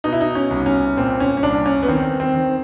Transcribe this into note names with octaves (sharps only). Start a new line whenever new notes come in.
B2 D#4
E4
D#4
C#4
C2
C#4
A#2 C4
C#4
C#4
C2 D4
C#4
B3
D#3 C4
C4
D#3